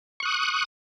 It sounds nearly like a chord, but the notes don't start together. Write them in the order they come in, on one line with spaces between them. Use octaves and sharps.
C#6 F#6 D#6